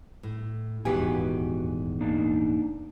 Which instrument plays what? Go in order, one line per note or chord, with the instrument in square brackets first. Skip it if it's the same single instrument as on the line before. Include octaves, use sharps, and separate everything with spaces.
[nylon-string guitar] A2
[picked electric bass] D#1 G#2 [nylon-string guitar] E2 G4 [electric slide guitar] F#4 B4 G#5
[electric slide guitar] A#3 D4 D#4